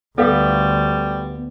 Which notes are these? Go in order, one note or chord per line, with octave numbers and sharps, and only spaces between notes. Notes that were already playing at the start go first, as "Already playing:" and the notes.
D2 G3 B3 A4 F5 D#6